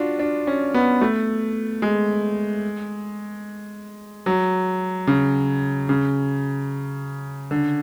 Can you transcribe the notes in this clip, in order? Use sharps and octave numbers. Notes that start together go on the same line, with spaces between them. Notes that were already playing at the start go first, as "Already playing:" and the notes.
Already playing: D4 F4 F#4
D4
C#4
B3
A3
G#3
F#3
C#3
C#3
D3